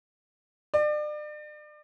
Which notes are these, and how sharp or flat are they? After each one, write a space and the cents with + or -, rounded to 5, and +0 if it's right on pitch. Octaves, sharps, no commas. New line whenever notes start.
D5 +35